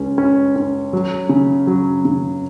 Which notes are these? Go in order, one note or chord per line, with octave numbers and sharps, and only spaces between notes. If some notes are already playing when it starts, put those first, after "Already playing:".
Already playing: C#2 C#4
C#4
C#4
F#3
C#3
F#3
C#3